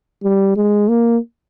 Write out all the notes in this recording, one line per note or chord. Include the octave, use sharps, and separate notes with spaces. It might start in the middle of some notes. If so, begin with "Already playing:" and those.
G3
G#3
A#3